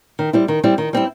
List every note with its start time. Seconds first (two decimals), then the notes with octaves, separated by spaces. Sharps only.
0.19 D#3
0.33 G3 C4 E4
0.48 D#3
0.64 G3 C4 E4
0.78 D#3
0.93 G3 C4 E4